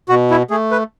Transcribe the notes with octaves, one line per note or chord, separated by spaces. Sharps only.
B2 F#4
E4
A3 G#4
B4